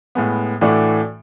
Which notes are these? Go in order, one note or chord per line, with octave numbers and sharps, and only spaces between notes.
A2 G#3 B3
A2 E3 A3 D4 F#4